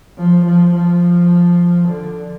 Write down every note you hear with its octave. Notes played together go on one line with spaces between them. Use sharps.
F3
F3
F3
D3